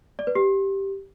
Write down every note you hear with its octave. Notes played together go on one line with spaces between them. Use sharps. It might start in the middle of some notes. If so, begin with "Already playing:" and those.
D5
B4
G4